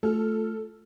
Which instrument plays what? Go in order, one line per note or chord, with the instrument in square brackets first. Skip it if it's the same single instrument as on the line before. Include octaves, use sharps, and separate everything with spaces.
[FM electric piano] A3 F6 [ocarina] F4 [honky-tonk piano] A4